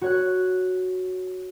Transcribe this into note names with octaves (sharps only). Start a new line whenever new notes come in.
F#4 C#5 F#6